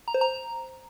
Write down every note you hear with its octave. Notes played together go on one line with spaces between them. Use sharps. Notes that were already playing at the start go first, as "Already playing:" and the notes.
A#5
C5
A#5